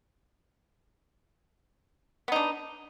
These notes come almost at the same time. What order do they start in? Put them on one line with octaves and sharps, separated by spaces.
B3 D#4 D4